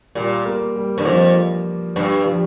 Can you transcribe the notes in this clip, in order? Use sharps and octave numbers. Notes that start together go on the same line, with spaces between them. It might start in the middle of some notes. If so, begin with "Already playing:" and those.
A#2 G3
A#3
G3
G2
F2 F3
G2 G3
F3